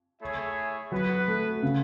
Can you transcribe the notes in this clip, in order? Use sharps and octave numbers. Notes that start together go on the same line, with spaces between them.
A3 E4 G#4 C#5 E5
F#3 B3 F#4 B4
A3
C#3